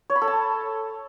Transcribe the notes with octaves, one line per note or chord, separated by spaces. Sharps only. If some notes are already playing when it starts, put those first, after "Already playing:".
C#5
B5
A4
A5